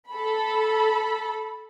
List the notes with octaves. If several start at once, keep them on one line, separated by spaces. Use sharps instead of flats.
A4 B5